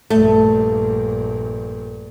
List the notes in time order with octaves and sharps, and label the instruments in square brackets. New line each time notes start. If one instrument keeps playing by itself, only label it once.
[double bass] A#1 G2 [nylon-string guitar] A3